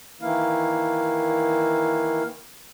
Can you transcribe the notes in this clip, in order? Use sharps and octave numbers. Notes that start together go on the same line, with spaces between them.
D#3 E3 A#3 E4 F5